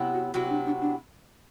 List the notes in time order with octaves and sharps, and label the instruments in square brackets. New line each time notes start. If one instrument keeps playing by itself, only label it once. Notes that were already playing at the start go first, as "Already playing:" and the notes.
Already playing: [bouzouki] C3 F#3 B3 E4
[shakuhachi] F#4
[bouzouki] C3 F#3 B3 E4 [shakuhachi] F#4
[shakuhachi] D4
D4
D4